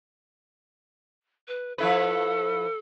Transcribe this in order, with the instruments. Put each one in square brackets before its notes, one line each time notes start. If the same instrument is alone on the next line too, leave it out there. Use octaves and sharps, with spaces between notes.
[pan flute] B4
[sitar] F3 E4 B4 [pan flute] A4